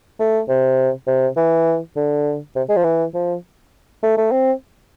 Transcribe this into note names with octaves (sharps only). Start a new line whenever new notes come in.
A3
C3
C3
E3
D3
C3
G#3
F3
E3
F3
A3
A3
C4